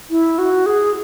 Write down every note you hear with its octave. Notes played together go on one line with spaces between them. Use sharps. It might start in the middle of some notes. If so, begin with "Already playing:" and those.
E4
F#4
G#4